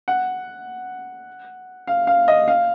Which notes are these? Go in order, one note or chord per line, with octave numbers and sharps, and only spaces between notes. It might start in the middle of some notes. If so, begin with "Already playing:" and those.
F#5
F5
F5
D#5
F5